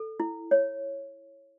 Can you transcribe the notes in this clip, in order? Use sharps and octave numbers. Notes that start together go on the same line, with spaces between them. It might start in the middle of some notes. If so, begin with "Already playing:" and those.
Already playing: A4
E4
C#5